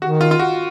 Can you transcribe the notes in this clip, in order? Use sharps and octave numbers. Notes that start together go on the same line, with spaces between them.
D#3 F#4
F4
F4
F#4